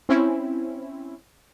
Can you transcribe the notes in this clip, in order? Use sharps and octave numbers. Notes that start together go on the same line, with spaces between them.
C4 C#4 E4